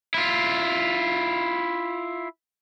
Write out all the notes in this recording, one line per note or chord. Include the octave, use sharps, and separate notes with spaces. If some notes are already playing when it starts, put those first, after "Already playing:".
E4 F4